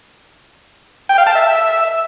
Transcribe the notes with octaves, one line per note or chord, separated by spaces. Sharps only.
G5
F5
A5
E5